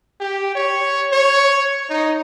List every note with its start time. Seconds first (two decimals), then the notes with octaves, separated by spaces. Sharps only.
0.20 G4
0.55 C#5
1.12 C#5
1.90 D#4